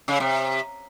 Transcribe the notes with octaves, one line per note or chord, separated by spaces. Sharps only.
C#3
C3